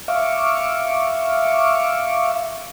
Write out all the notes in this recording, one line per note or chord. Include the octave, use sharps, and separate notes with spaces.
E5 F5 C#6 D6